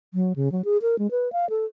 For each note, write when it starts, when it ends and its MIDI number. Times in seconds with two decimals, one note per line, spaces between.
0.14 0.33 54
0.36 0.51 49
0.52 0.62 54
0.65 0.77 68
0.82 0.98 70
0.99 1.10 56
1.11 1.31 71
1.33 1.49 77
1.50 1.65 69